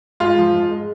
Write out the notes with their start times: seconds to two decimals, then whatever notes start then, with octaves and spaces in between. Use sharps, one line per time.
0.20 G#2 F4
0.38 F3
0.55 G#2
0.71 G#3